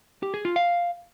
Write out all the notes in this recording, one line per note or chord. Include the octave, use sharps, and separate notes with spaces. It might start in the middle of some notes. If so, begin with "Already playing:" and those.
G4
G#4
F4
F5